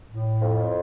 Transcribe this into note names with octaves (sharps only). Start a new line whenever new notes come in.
A2
F2